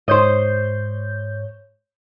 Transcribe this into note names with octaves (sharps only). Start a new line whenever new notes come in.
G#2 C5 C#5 D#5 G6